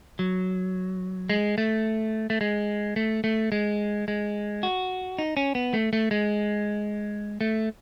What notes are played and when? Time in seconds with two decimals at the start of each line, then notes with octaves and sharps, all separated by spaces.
0.19 F#3
1.30 G#3
1.58 A3
2.30 A3
2.41 G#3
2.96 A3
3.24 A3
3.52 G#3
4.08 G#3
4.63 F#4
5.19 D#4
5.37 C#4
5.55 B3
5.74 A3
5.93 A3
6.11 G#3
7.41 A3